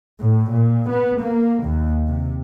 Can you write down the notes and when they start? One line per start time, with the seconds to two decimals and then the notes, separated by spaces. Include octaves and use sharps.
0.21 A2
0.52 A#2
0.91 B3
1.21 A#3
1.62 D#2
2.07 C3